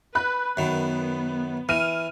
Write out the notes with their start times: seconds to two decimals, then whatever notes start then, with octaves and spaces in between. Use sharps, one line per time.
0.15 B4 B5 F#6
0.57 F#2 D#3 B3
1.69 E3 F6 D#7